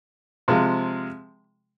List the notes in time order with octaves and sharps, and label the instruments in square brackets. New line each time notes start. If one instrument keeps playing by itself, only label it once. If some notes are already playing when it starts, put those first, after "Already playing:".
[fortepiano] C3 F3 G#3